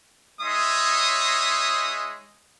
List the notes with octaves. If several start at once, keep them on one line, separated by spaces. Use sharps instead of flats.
G#3 D#4 C#5 E5 C6 D#6